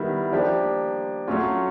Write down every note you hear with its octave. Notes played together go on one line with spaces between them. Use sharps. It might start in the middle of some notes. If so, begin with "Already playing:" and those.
Already playing: D#3 G3 B3 E4
F3 A#3 D4 G4
F#3 A3 C#4 F4